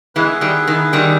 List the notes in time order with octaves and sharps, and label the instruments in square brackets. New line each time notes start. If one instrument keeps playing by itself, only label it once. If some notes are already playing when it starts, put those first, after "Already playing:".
[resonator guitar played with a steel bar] E3 G#3 [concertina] B3 E4 G#4 B4 E5
[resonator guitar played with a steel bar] D#3 G3
D#3
D#3 G3